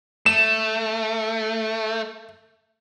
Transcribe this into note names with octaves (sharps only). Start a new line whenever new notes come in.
A3 E7